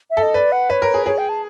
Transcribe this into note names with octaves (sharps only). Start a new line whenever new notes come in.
E5
A4
D#5
B4 D5
F#5
B4 C#5
A#4
G#4
G#4 C#5
G5
A5